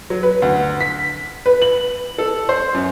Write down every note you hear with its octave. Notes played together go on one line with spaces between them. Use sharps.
F#3
B4
D2
B6
B4
F#7
A4
C5
F#2